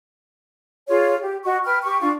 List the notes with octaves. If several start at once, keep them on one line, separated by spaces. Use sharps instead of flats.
F4 G#4 C#5
G4
F#4 D#5 C#6
B4 G5 F6
G4 C#6
D4 F4 C#6